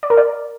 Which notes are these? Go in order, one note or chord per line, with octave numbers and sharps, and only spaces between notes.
D5
A#4
D5